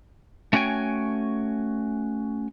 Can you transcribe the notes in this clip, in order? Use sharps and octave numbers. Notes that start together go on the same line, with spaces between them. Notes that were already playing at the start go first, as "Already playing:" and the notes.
A3 C#4 F#4 C#5 G5 G#5